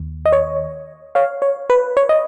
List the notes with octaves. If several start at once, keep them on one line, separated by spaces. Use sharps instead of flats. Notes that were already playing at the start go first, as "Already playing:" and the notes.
Already playing: D#2
D#5
C#5
C#5 F5
C#5
B4
C#5
D#5